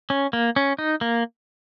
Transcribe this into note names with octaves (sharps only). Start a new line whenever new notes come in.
C#4
A#3
C#4
D#4
A#3